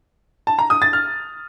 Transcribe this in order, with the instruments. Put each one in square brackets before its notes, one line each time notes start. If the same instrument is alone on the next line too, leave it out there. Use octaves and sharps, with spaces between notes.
[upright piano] A5
A#5
D#6
A6
F6